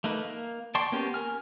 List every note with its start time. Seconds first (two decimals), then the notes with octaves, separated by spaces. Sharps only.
0.04 A3 A#3 D#4 B4
0.25 A#3
0.75 D5 G5 A5 C6 C#6
0.92 A#3 B3 C#4 G4
1.14 A#4 G#5 F6